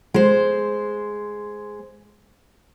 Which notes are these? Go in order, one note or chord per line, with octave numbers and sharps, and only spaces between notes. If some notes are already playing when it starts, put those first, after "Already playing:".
G#3 C5